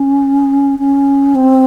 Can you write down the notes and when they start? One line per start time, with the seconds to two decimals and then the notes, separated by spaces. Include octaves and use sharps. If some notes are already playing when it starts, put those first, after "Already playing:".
Already playing: C#4
0.79 C#4
1.35 C4